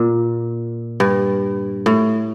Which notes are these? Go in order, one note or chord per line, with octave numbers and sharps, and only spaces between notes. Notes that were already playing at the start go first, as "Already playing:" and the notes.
Already playing: A#2
G2
A2